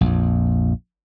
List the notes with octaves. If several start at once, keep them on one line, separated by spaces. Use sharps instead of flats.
A#1 F2